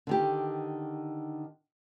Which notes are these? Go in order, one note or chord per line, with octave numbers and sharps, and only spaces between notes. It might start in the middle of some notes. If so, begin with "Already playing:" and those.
D3 D#3 G4